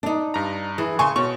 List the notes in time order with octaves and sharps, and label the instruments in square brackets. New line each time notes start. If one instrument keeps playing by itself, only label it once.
[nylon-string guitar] D4 D#4
[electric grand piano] G2 A#5
[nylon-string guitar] E3 [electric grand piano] G#4
[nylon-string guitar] C#3 G#5 [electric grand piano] C6 C#6
[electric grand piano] B2 C#6 [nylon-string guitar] C#5